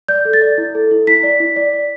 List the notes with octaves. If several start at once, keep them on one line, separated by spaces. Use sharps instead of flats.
D5 G6
A4
A6
D5
E4
A4
E4
E4 B6
D5
E4
D5
D5